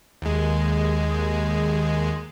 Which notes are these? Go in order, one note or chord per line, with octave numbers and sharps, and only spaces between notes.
D#2 G#3